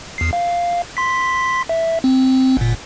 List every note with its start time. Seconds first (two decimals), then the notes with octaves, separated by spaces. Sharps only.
0.18 E2 C7
0.33 F5
0.97 C6 B6
1.69 E5
2.04 C4
2.57 G1 A#2